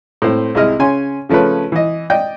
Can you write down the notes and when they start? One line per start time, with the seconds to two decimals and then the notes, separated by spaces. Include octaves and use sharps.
0.22 A2 C4 C5
0.55 C2 C3 G#3 E4 D#5 F6
0.79 C#3 C#4 G#5 C6
1.29 C#3 F3 A3 C#4 B4
1.72 E3 D#5
2.10 D5 D#5 G5